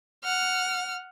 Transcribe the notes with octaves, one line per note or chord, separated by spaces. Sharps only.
F#5 F6